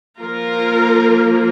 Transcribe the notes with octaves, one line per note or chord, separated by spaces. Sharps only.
F3 A#3 F4 A#4